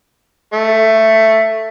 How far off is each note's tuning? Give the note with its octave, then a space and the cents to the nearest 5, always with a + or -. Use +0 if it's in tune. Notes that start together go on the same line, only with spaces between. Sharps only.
A3 +10